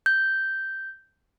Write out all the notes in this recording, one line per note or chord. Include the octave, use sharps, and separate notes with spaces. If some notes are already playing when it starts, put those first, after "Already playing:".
G6